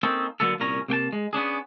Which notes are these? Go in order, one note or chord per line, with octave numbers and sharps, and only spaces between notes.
A#3 C4 C#4 D#4 A4
D3 F#3 A#3 B3 A4
C2 A#2 C#4 A#5
C3 A#3 G5 A5
G#3
B3 C#4 D4 G#4